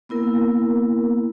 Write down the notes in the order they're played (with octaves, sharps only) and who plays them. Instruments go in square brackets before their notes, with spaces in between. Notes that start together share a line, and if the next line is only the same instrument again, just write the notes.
[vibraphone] A#3 B3 E4 A#4